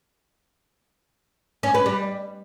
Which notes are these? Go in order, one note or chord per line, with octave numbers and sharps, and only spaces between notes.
C#4
B4
G3